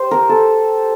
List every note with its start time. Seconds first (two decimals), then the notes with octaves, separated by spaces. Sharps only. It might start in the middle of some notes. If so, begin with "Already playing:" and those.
Already playing: G4 C5
0.11 A#4
0.29 A4